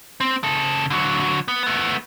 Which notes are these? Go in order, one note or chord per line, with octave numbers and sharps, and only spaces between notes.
C4
C#3 A4
D3 F#3
B3
A3 B3